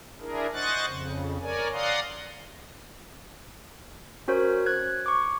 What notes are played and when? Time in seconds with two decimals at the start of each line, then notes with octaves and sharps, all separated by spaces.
0.20 D4 E4 G#4 A#4
0.54 C5 D#5 F#5 C#6 F#6 A6
0.86 F2 C#3
1.41 A#4 C#5 D5 G#5
1.73 D5 F5 F#5 A#5 C6 D#6
4.28 C#4 F#4 A#4 C5 C#5
4.66 F#6 G#6
5.06 C#6 D6